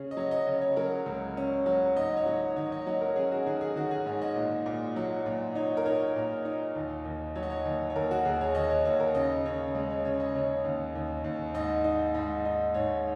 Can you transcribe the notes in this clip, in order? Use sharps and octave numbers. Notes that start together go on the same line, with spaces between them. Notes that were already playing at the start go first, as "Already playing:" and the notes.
Already playing: C#3 C#4 G#4
D#5
F#3 C#5
D#5
C#3 D#5
C#5
F#3 A#4
C#2
C#4
F#3
G#2 D#5
C#5
F#3
D#3 C#5
D#5
F#3 C#5
A#4
C#4 G#4
F#4
D#3 G#4
G#4
D#3 F#4
G#4
G#2 C#5
D#5
A#2
A#2
F#3
A#2
D#4 C#5
A#4
D#4 C#5
A#2
D#4
D#2
D#2
F#3 C#5
D#5
C#5
D#2
C#5
D#2 A#4
F#4
D#2 G#4
C#5
D#2 D#5
C#5
D#2 C#5
A#4
C#3 D#5
C#3 C#5
G#3 D#5
C#5
C#3 C#5
D#5
C#3 C#5
D#2
D#2
D#2
G#2 D#5
D#4
G#2
D#4
G#2 C#5